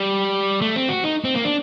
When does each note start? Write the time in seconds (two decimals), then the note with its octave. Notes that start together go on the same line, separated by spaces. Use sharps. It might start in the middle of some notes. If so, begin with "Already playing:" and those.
Already playing: G3
0.61 A3
0.76 C4
0.89 F#4
1.04 D#4
1.24 C4
1.35 A#3
1.45 D4